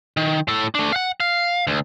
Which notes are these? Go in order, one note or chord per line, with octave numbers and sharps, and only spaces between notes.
D#3
A2 A4
A3 D4
F5 F#5
F5
D2